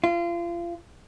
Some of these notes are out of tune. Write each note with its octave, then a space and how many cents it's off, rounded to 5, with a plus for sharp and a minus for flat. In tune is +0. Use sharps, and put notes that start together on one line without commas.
F4 -30